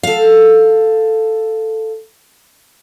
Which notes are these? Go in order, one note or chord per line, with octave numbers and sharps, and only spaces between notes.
A4 F5